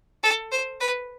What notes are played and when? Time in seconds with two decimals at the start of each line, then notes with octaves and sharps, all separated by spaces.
0.23 A4
0.51 C5
0.81 B4